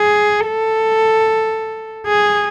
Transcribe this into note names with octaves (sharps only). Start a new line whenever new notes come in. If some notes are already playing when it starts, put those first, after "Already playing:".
Already playing: G#4
A4
G#4